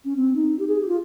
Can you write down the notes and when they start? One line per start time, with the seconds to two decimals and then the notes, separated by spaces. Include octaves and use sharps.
0.05 C#4
0.17 C4
0.36 D#4
0.59 G4
0.68 G#4
0.81 G4
0.88 F4